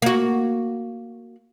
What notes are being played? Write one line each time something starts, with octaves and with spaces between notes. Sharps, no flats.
A#3 F#4